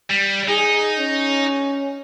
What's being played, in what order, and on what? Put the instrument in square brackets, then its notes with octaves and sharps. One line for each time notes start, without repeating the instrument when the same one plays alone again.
[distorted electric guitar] G3
[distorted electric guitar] D#4 [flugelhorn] G#4
[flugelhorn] C#4